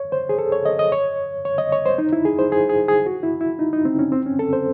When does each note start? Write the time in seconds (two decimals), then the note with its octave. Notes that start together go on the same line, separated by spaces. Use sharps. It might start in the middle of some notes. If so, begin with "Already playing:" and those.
Already playing: C#5
0.12 C5
0.29 G#4
0.38 A4
0.52 C#5
0.66 D#5
0.79 D#5
0.92 C#5
1.45 C#5
1.58 D#5
1.72 C#5
1.86 C5
1.98 D#4
2.13 E4
2.25 G#4
2.39 C5
2.52 G#4
2.69 G#4
2.88 G#4
3.06 F#4
3.23 E4
3.41 E4
3.59 D#4
3.73 D#4
3.85 C4
3.99 C#4
4.12 C4
4.26 C#4
4.39 A4
4.53 C5